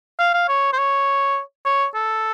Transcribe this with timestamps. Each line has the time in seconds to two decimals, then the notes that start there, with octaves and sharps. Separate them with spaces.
0.19 F5
0.34 F5
0.48 C#5
0.73 C5
0.78 C#5
1.65 C#5
1.95 A4